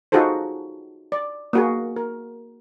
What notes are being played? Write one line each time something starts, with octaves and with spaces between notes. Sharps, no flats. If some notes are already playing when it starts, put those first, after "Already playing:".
D#4 F4 F#4 G#4 A4 C5
D5
A#3 F#4 G#4
A#4